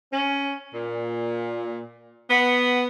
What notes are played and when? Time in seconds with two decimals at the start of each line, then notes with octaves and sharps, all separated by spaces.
0.12 C#4
0.75 A#2
2.30 B3